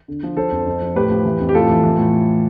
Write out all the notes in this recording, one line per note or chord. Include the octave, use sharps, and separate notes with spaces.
D3
F3
F3 A4 C5
F2
F2
F3
A2 G4 B4
F3
E3
F2
G4
A2 F4 A4
E3
E3
A2